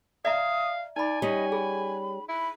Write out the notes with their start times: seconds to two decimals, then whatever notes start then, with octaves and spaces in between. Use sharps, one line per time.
0.25 D5 E5 F5 A#5 D#6
0.96 D#4 D5 G#5 B5
1.22 G3 C#4 D#5
1.52 G#4 B5
2.29 E4 B5